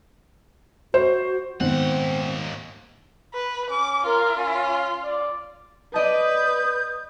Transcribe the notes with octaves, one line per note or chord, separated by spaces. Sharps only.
F#4 C5
D#2 G#2 D#3 B3 C4 F#5
B4
C#4 D6
F4 A#4
C#4
D5
B4 D5 D#5 A5 D#6 G6